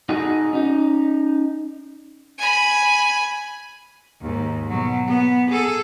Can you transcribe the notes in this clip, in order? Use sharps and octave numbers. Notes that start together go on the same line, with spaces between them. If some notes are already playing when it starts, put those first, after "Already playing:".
D#4 F#4 G#4 A4 D#5
C#4 D#4
G#5 B5
D#2 G#2
B2 F#3
B3
G#4 A4